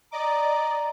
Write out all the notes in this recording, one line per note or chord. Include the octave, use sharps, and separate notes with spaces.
D5 D#5 A#5 D6